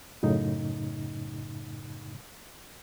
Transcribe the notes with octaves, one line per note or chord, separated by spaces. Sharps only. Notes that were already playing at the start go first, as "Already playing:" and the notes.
F#2 A2 C#3 D#4